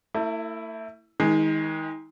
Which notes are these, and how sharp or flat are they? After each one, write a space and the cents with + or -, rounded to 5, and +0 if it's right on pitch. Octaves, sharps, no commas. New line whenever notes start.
A3 +40 E4 +0
D#3 +30 G#3 +0